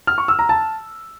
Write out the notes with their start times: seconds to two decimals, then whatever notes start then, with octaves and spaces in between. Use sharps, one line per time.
0.07 F6
0.18 C#6
0.28 E6
0.39 A#5
0.49 A5